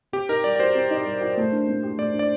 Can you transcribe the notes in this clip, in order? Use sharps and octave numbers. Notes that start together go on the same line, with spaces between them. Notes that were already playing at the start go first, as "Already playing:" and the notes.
C4 G4
D#4 A#4
G3 D5
D5
F#4 C5
C4
D#4
G3
F#4
A3
D4
A#2
G4
A3 D5
D4
D5